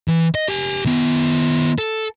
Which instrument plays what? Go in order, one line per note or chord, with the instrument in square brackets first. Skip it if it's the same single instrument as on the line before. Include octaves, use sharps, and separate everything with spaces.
[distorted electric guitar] E3
D#5
G4 G#5
D#3 B3
A4